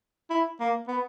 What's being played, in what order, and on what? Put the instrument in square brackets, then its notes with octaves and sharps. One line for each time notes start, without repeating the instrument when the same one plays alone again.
[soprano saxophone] E4
A#3
B3